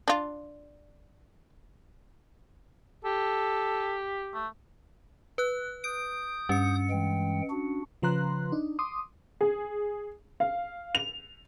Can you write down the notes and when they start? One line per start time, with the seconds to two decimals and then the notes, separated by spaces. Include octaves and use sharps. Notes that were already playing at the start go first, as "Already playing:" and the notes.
0.08 D4 F4
3.04 G4 A4
4.34 A3
5.38 B4 F#6
5.84 D#6 G6 D7
6.49 G2 C#4 C#7
6.90 E3 G#3 G5
7.50 D4 F#4
8.02 C#3 F3 B4 A#5 C6 F#6
8.52 D4 D#4
8.79 C6 D6 D#6
9.41 G#4
10.40 F5
10.95 F7